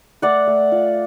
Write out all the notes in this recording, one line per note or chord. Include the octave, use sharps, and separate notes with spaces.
A3 D5 F#5
A3
F4